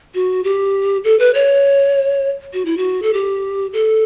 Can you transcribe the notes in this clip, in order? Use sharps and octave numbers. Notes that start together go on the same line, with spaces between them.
F#4
G4
A4
B4
C#5
F#4
E4
F#4
A4
G4
A4